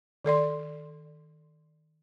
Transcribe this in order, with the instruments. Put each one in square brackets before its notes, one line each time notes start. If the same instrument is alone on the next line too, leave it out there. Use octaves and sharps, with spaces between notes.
[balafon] D#3 A4 D5 C6